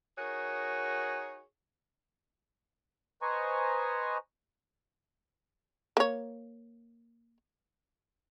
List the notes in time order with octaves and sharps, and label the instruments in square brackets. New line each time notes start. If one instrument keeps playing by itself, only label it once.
[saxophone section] D#4 F#4 G#4 A#4 C#5
[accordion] B4 C5 D#5 G#5 A#5 C#6
[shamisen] A#3 C#5